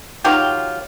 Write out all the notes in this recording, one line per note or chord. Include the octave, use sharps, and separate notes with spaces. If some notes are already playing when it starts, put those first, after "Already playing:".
D#3 F#3 F4 G4